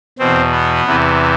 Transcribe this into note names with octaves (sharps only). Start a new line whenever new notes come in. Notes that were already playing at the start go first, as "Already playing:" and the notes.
E2 B2 C4
B3
E2 C3 E3